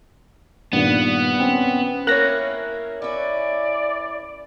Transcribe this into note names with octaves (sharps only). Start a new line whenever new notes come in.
G2 A#2 D#3 B3
C4 C#4
A#3 C#4 E4 A#4 C#5 F#6 A#6
C#4 E4 D5